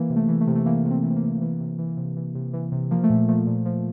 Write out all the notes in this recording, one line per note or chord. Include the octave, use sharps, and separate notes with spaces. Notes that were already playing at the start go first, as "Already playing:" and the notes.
Already playing: E3 A#3
C3
A3
E3
A3
C3
A3
E3 A#3
C3
C4
E3
C4
A#3
C3
E3
C3
E3
C3
E3
C3
E3
C3
F3 A#3
A3
A#2
F3 A3
A#2
F3